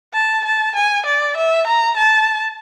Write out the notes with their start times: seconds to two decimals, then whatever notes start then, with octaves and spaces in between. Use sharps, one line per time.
0.14 A5
0.45 A5
0.75 G#5
1.06 D5
1.36 E5
1.67 A#5
1.97 A5